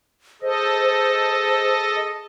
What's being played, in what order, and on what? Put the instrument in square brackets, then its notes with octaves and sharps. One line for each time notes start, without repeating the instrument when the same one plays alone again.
[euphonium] G#4 [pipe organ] A4 D#5 [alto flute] C5